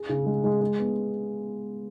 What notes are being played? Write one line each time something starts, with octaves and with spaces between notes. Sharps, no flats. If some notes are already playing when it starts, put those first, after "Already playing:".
Already playing: G#4
C#3
G#3
G#3
G#3
B3